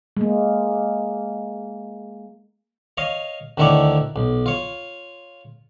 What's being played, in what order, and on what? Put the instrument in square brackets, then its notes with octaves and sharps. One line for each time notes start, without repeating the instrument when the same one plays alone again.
[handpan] G#3 A#3
[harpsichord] C#5 D#5 F5
D2 D#3 E4 A4 C#5 D5
B1
F4 C#5